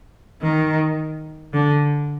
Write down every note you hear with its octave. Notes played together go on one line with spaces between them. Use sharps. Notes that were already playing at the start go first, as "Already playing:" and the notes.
D#3
D3